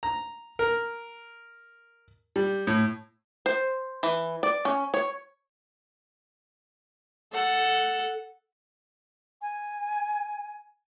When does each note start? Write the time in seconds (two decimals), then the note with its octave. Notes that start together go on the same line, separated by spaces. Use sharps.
0.03 A#5
0.59 A#4
2.36 G3
2.67 A2
3.46 C5
4.03 E3
4.43 D5
4.65 C#4
4.94 C#5
7.33 A4 F#5
9.42 G#5